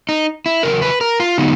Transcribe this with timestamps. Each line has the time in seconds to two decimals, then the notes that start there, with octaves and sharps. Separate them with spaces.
0.09 D#4
0.46 E4
0.63 E2 C#3 F#3 A#4
0.82 B4
1.01 A#4
1.20 F4
1.38 D3 F#3 B3 D#4